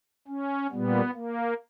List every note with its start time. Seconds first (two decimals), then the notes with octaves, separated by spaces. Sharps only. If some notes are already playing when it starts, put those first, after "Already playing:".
0.27 C#4
0.71 A#2 G3 B3
1.15 A#3